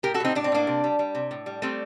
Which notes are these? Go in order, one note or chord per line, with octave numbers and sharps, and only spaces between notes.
A2 G4 A#4
F#4 A4
A2 C4 D#4
A2 D4
C4
A2 A#3 D4
C3
G3
G3
C3
A2
G3
G3 A3 C4